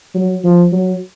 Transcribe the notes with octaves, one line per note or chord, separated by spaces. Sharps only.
F#3
F3
F#3